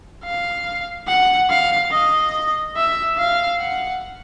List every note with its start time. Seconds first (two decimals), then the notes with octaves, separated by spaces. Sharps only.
0.25 F5
1.08 F#5
1.49 F5
1.91 D#5
2.76 E5
3.18 F5
3.60 F#5